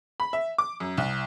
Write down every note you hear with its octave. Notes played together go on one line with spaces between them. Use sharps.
B5
E5
D6
F#2
C2